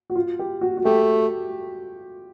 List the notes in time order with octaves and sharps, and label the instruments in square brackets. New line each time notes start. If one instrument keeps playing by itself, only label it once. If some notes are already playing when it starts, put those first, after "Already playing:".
[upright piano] F#4
F4
G4
F#4
F#4
[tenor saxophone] A3 [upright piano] G4